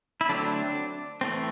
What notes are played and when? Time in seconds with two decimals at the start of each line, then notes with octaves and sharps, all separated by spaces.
0.21 E4
0.29 D3 F#3 A3 C4 D4
1.21 E3 A3 C4